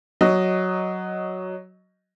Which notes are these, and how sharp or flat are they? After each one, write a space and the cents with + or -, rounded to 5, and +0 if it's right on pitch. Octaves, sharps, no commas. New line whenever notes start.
F#3 +0 D#5 +0